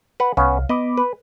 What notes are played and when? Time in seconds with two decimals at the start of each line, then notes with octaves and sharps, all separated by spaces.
0.20 B4 F#5
0.37 C2 B3 C#4 F5
0.69 B3 D#5 B5 D6
0.97 B4